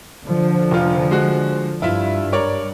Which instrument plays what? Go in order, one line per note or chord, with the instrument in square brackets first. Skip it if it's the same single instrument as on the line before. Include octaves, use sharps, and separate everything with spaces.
[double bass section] D3 F3
[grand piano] F1 F4
G#3 F#4
[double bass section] G2 [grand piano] E4 F4 E5
[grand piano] A#4 C#5 D5